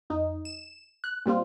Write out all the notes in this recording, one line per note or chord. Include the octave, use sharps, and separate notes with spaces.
F2 D#4
E7
F#6
A#2 G3 C4 F4